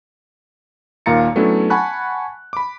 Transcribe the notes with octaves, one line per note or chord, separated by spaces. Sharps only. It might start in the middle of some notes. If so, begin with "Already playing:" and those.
D#2 A#2 F5 A#5 A6 C#7
F#3 A3 B3 C#4 D4 E4
F#5 G#5 A5 B5 C#6 F#6
B5 D6